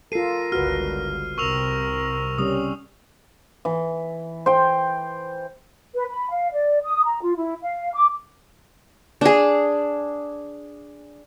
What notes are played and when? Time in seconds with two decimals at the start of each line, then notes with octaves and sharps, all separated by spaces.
0.12 F4 A4 A#4 C7 D#7
0.52 G1 C#2 D3 F#4 B4 F6
1.38 C2 C3 C4 A#4 C#6 E6 F7
2.38 C#3 G3 C#4 D#6
3.65 E3
4.46 C5 G5
5.95 B4
6.10 B5
6.29 F5
6.51 D5
6.83 D#6
7.04 A#5
7.22 F4
7.37 E4
7.62 F5
7.94 D6
9.21 D4 G#4